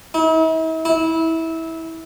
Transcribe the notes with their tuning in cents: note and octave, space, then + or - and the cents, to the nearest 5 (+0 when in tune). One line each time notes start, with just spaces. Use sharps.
E4 -45
E4 -20